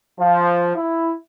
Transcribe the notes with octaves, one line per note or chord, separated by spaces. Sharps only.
F3
E4